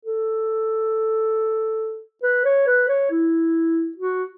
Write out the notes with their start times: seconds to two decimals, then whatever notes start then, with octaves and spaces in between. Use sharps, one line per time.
0.05 A4
2.23 B4
2.45 C#5
2.67 B4
2.89 C#5
3.11 E4
3.98 F#4